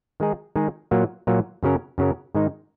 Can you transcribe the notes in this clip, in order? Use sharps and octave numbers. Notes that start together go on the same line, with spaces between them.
D#3 G#3 D#4 G#4
D#3 G#3 D#4 G#4
A#2 F#3 A#3
A#2 F#3 A#3
F#2 C#3 F#3 C#4 A#4
F#2 C#3 F#3 C#4 A#4
G#2 D#3 G#3 D#4